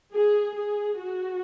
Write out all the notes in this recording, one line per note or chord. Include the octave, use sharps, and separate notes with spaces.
G#4
G#4
F#4